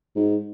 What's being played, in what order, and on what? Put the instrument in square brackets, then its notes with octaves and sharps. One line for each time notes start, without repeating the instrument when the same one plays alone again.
[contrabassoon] G#2